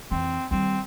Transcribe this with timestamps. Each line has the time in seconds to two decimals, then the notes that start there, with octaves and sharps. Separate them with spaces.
0.11 F2 E3 C4
0.51 D#3 G3 C4